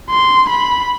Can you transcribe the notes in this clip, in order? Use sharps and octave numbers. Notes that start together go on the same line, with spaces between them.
C6
B5